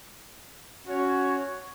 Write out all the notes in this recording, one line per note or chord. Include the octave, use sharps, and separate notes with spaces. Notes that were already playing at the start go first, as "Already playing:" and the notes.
C#4 F#4 C#5